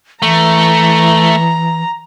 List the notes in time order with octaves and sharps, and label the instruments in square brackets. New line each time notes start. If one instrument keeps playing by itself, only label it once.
[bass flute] E3 [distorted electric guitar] A3 [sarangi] A#5